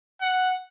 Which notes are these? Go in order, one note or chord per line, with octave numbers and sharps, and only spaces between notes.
F#5